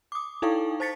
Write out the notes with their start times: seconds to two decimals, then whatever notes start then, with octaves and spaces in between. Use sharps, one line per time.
0.12 D6 D#6
0.42 D#4 E4 A4 F5 G5 C#6
0.80 C5 A5 A6 B6 C#7